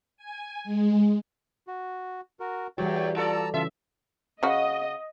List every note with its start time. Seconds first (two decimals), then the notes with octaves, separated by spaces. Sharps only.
0.17 G#5
0.64 G#3
1.67 F#4
2.40 F#4 A#4
2.78 E2 E3 G3 F#4 C#5 D5 G5
3.16 F4 A4 D5 A5 A#5 E6
3.54 C#3 E3 C#4 F4 A4 E5
4.43 C#3 F#4 D#5